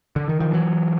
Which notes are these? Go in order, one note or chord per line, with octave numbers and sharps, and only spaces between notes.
D3
D#3
D#3 F3
E3 F#3